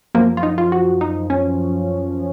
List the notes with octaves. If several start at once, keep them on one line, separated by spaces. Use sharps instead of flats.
F#2 F3 A#3
F4
D#4
F4
F#4
D#4
C#4